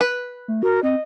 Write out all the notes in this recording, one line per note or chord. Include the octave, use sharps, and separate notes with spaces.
B4
A3
F#4 A#4
C4 D#5